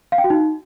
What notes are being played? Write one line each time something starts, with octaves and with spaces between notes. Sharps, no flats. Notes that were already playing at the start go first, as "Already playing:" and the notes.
F5
G5
F#4
D#4